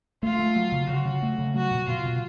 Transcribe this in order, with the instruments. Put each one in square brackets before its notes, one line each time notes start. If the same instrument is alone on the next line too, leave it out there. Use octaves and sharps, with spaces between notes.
[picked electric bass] A3 [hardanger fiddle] F4
[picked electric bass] A3
F#3
C#3
[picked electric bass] C#3 [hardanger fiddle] F#4
[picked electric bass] C#3
A3
C#3
[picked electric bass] F#3 [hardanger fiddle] F#4
[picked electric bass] B2
[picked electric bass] B2 [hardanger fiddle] F4
[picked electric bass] B2